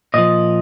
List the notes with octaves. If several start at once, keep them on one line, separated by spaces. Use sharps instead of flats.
A#2 F3 D#5